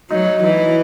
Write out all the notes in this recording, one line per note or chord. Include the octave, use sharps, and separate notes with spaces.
F#3 D#4
E3 D#4